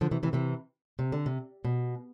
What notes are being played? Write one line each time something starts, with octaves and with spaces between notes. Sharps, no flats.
D3 F3
C3 E3
C3 E3
C3 E3
C3
D3
C3
B2